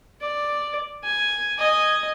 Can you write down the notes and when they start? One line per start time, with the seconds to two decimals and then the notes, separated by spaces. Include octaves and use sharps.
0.21 D5
1.04 G#5
1.58 D#5 G#5